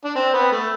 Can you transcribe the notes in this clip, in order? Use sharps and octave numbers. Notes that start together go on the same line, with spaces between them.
D4
C4
B3
A3